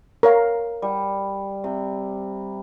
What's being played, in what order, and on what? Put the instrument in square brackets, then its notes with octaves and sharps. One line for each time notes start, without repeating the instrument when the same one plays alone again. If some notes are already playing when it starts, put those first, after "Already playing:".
[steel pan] A#4 C#5 F5
[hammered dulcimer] G3
C3